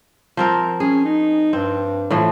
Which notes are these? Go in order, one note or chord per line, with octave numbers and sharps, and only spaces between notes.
F3 C4 A#4
C#4 G#4
D#4
G2 C4
A2 E3 F3